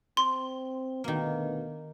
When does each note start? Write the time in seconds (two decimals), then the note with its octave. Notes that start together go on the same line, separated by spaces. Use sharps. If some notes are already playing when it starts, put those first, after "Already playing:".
0.17 C4 C6
1.04 D2 B2 D#3 A#3 B3